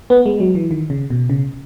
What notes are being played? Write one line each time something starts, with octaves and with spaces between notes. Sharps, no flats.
B3
G#3
F#3
E3
D#3
C#3
B2
C#3